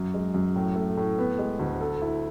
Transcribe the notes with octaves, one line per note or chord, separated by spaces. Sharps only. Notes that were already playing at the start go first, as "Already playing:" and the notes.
Already playing: F#2
G#3
F#2
A2
A3
A2
B3
G#3
D2
A4
E4